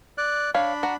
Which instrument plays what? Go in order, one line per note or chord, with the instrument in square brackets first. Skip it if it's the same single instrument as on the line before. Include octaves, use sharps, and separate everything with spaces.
[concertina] D5 F#6
[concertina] D4 B5 [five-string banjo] C#5 F5
[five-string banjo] F#4 A#5